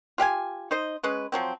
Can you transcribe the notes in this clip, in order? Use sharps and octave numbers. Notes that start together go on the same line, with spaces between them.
F4 G4 F5 G#5
D#4 C5 D#5
G#3 C#4 B4
F3 F#3 C4